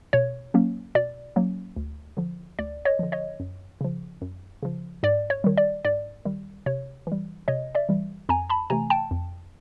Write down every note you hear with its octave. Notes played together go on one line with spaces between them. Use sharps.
B2 C#5
F#3 A#3 C#4
B2 D5
F#3 A#3 C#4
D2
D3 F3
D2 D5
C#5 D#5
D3 F3
C#5 D#5
F#2
C#3 F3
F#2
C#3 F3
G#2 D5
C#5
D#3 G3
D5
G#2 D5
D#3 G3
C3 C#5
E3 G3
C3 C#5 D#5
D5 E5
E3 G3
F2 G#5 A#5
A5 B5
C3 E3 A3 G#5 A#5
G5 A5
F2